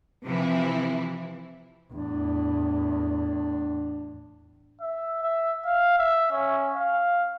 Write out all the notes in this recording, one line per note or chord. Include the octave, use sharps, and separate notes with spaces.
C3 E3 F3 E4
E2 A2 D4
E5
E5
F5
E5
C#4
F5